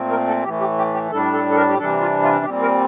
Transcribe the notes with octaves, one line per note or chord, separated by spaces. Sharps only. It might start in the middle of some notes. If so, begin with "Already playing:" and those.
Already playing: A#2 A3 C4
A#4
A4
A2 E3 A3 G4
G4
G4
G4
A2 G3 D4 A4
A4
A4
A#4
G4
C3 E3 G3 D4 A4
F4
F4
A#2 G3 C4 G4
A#4